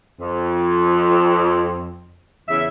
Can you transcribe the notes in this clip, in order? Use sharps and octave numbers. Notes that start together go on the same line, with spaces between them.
F2
E2 C#3 E5